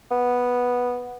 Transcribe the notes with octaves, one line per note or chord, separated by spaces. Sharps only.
B3